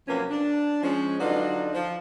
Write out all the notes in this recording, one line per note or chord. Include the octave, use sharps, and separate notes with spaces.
C3 F3 F#3 A#3 C#4 B4
D4
F3 G#3 C#4
D3 F#3 D#4 F4 B4 D5
F3